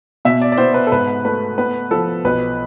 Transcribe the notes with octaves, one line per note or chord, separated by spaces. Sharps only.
B2 E5
D5
D5
B3 C5
B4
A4
G#2 B4
A3 B4
B3 B4
F3 A4
B1 B4